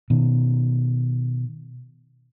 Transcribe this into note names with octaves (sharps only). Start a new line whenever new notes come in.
B2 D#3